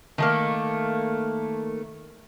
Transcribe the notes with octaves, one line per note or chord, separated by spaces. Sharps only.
D#3 A3 A#3